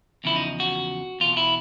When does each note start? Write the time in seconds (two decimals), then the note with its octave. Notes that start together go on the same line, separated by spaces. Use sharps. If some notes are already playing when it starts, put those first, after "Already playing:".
0.24 E2 C#3 F3 E4
0.36 D#4
0.60 F#4
1.20 E2 B2 F4
1.37 E4